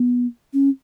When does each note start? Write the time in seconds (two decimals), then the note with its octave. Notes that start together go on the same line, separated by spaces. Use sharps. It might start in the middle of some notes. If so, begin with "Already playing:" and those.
Already playing: B3
0.53 C#4